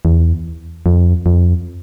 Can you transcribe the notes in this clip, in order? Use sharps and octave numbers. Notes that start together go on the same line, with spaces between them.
E2
F2
F2